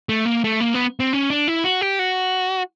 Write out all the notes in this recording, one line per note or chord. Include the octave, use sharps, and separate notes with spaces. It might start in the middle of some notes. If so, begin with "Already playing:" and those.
A3
A#3
A3
A#3
B3
C4
C#4
D4
E4
F#4
G4
F#4